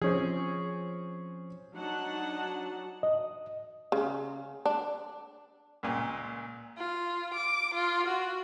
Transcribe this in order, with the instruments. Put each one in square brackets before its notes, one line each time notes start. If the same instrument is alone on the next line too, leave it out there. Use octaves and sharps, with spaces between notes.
[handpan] F3 [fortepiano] C4 C#4 G#4
[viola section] F#3 D4 D#4 F#5 A5
[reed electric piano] D#5
[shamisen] C#3
D4
[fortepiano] C#2 A#2
[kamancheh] F4
D6
F4
F#4